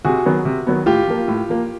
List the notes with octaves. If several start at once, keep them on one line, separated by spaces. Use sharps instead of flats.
C3 F#4 G#4
D#3 F#3 B3
C3
D#3 F#3 B3
A2 F4 G4
F3 A#3
A2
F3 A#3